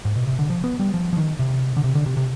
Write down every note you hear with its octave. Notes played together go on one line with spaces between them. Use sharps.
G#2
B2
C3
D3
F3
B3
G3
F3
F3
D#3
C3
D3
C3
D3
C3
C3